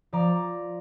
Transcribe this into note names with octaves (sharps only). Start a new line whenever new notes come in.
F3 D5 A#5